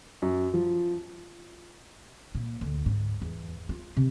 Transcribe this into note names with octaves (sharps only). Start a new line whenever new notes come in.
F#2
F3
A#2
D2
G#2
E2
F4
C3